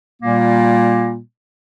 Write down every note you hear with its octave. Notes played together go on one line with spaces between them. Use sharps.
A#2 G3 A#3